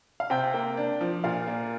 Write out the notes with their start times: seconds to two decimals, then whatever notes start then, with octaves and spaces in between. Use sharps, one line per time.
0.20 F5
0.30 C3 G5
0.54 A#3
0.77 D4
1.01 F3
1.24 A#2 F5
1.47 A#3